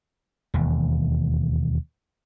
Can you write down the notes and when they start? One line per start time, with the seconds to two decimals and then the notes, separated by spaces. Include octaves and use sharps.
0.54 E1 D#2